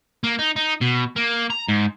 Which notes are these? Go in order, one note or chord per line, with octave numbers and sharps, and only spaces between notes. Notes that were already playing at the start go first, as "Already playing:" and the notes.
A#3
D#4
D#4
B2
A#3
A#5
G#2